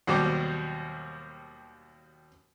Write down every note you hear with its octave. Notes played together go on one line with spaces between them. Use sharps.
D#2 B2 F#3 G3 C5 D6